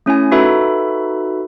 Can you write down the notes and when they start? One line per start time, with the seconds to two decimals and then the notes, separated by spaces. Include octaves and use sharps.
0.06 A3 C#4 E4 G#5
0.31 D#4 F#4 A4 B4 E5 B5